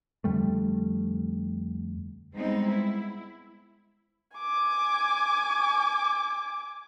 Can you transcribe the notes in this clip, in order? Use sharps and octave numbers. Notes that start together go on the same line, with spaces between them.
F2 D3 G3 A3
G3 G#3 B3 C4 D#4
E4
G#5 D6